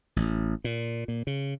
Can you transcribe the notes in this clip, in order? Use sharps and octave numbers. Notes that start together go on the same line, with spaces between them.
A1
A#2
A#2
C#3